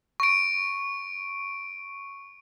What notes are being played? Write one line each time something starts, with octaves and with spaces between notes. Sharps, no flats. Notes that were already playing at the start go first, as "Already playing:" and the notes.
C#6 D7